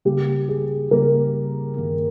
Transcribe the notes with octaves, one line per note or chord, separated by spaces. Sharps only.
C#3 G3 A#3 G4
G#4
C#3 G3 A#3 A#4
G2 D#3 A#3